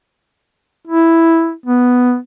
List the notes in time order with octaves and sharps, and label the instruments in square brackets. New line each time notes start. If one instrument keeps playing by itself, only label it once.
[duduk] E4
B3